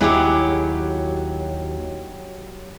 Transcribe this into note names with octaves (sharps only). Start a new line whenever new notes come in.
D#2 F#3 E4 G4 G#4